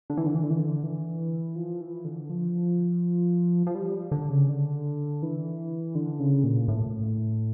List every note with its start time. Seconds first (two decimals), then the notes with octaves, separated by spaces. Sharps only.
0.10 D3
0.17 E3
0.26 D3
0.34 E3
0.43 D3
0.50 E3
0.59 D3
0.83 E3
1.56 F3
1.81 E3
2.05 D3
2.30 F3
3.67 F3
3.75 G3
4.12 D3
4.30 C#3
4.49 D3
5.23 E3
5.95 D3
6.19 C#3
6.44 A#2
6.68 A2